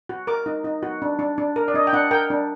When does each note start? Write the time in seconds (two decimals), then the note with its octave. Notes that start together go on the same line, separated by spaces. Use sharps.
0.09 F#4
0.27 A#4 D6
0.46 D#4
0.64 D#4
0.83 F#4
1.02 D4
1.19 D4
1.38 D4
1.56 A#4
1.68 D5
1.74 D4 D#5
1.87 G5
1.93 D4 F#5
2.11 A#4 G5
2.30 D4